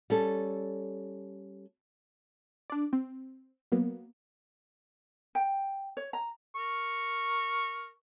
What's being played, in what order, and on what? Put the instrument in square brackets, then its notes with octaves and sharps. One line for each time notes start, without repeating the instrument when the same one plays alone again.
[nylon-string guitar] G3 C#4 A4
[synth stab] D4 D5
C4
F#3 A#3 B3
[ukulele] G5
C#5
A#5
[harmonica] A#4 C#6